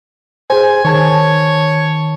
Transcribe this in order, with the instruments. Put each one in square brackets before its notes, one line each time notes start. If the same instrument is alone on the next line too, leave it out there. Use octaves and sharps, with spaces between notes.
[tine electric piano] G#4 C5 [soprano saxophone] G#5
[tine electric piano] D#3 A5 G#6 [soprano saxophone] C#5